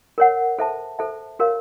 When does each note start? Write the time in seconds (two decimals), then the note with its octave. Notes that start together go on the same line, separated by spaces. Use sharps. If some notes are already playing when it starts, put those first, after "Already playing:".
0.18 A#4 C#5 F#5
0.59 A4 C5 E5 A5
0.99 A4 C5 E5 A5
1.39 F#4 A#4 C#5 F5